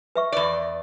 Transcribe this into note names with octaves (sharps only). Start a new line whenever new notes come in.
B4 E5 C#6
E2 D5